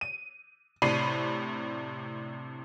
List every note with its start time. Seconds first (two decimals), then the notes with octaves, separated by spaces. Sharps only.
0.01 D#7
0.82 A2 C3 D4 B5 C7 D#7